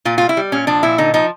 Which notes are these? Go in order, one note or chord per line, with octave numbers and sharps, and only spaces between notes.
A#2 F4
G3 F4
E4
G3
A#2 C#4
F3 D4
A#2 E4
D3 D#4
F3 D#4